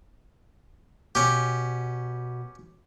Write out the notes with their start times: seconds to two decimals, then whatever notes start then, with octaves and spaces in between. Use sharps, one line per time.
1.15 B2 C#4 G4